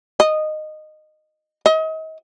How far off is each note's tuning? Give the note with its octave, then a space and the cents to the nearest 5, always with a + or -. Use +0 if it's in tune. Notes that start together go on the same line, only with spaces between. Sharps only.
D#5 -15
D#5 +35